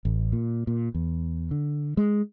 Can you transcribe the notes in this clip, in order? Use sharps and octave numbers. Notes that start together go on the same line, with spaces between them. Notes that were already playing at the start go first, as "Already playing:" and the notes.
A1
A#2
A#2
E2
D3
G#3